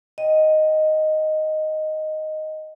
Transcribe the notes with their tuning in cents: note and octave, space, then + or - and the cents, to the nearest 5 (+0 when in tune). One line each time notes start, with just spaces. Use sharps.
D#5 +0 G5 +0